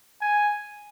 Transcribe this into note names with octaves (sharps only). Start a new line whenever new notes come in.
G#5